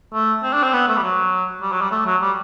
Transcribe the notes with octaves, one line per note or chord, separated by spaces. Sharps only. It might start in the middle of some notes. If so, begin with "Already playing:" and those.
A3
C4
D4
C4
B3
A3
G3
F#3
G3
F#3
G3
A3
F#3
G3